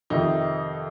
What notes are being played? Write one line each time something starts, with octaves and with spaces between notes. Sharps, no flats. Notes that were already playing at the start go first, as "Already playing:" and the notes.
F2 C3 D#3 D#4